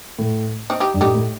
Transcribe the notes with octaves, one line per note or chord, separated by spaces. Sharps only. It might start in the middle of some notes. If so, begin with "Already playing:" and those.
A2
C4 D#4
D#4 G4
G2
A2 D#4 G4
A2